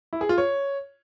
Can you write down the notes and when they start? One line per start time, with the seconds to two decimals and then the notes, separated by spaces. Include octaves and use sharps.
0.13 E4
0.21 G#4
0.29 F4
0.38 C#5